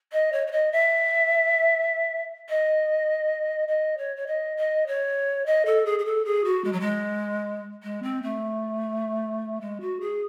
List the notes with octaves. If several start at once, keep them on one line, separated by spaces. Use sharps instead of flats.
D#5
C#5
C#5
D#5
E5
D#5
D#5
C#5
C#5
D#5
D#5
C#5
D#5
A4
G#4
G#4
A4
G#4
F#4
G#3
F#3
G#3
G#3
C4
A3
G#3
F#4
G#4